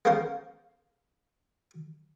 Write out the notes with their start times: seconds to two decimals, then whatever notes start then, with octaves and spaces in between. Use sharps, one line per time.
0.05 A#3 B3 C#4 A#4 C5 F5